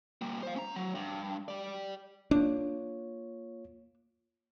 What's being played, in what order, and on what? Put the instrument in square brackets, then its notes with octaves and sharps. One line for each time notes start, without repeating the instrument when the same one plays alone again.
[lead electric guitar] G3 A#3
C5 F5
C#4 A#5
F#3
G2
G4 D5
[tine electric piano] A#3 F4 C#5 [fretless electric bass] D4